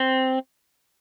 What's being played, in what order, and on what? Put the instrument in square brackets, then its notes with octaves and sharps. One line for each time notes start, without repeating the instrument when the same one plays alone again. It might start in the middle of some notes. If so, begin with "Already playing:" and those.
Already playing: [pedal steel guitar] C4